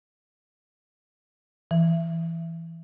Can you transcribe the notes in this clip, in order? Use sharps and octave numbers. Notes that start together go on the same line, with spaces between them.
E3